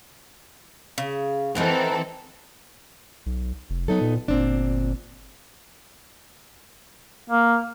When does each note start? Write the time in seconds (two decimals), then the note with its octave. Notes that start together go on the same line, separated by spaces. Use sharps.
0.98 C#3
1.55 E3 C4 D#4 A4 A#4 F#5
3.26 B1
3.70 F1
3.88 F#3 B3 D#4 A4
4.01 A#2
4.28 G1 A#2 C4 D4
7.30 A#3